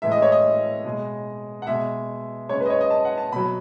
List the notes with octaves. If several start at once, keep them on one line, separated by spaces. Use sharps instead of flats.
A2 E3 G#3 E5
D#5
C#5
D#5
B2 G#3
F#5
B2 G#3 E5
C#3 G#3 C#5
B4
D#5
C#5
D#5
A5
F#5
A5
B2 F#3 B5